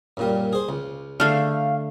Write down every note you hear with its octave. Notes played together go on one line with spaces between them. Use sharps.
F#2 A#2 G3
G#4 C5
C#2
D3 A3 F5